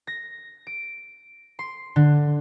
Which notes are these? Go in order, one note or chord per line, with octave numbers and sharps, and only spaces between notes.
A#6
D7
C6
D3